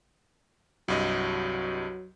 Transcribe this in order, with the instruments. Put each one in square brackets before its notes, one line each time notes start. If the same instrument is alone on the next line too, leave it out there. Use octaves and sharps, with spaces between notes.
[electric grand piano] C2 G2 D#5 [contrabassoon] F#3